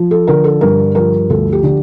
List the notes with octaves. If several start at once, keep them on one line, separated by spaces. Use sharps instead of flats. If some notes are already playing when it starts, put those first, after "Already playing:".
Already playing: F3
A4
D3 A#4
A4
G2 A#4
F3 A#4
D2 A4
G4
D3